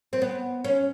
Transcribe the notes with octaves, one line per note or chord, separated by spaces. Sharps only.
C4
B3
C#4